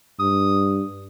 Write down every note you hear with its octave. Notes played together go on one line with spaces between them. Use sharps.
G2 D#6